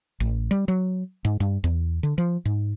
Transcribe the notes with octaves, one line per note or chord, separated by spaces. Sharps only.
A1
G3
F#3
G#2
G2
E2
D3
F3
G#2